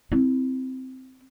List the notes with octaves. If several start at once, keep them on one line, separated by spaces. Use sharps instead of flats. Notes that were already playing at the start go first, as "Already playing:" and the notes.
C4 E4